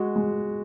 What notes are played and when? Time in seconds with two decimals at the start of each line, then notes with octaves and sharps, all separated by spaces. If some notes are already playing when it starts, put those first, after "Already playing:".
Already playing: G#3 F#4
0.16 G#3